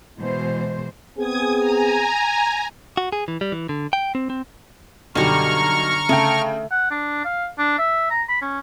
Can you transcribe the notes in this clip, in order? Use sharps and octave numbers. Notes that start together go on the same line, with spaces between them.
B2 E3 G#3 C5
B3 C4 G#4 D#6 G#6
G#5 A#5
F#4
G#4
E3
G3
E3
D3
G5
C4
C4
B1 F#2 D3 G3 F#5 A#5 C#6 F6
C#3 A3 G5
F#5
D4
F5
D4
E5
A#5
B5
C#4